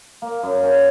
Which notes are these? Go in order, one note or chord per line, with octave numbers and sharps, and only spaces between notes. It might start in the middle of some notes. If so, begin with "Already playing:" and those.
A#3
F#2
C#4